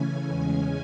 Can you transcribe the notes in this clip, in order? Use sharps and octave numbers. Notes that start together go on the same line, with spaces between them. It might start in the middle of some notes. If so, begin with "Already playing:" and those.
Already playing: C#3 E3 A3 C#4 G#5
E2 C#3 G#3 C#4